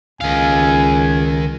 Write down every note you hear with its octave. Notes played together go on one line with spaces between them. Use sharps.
C#2 D#3 F5 G#5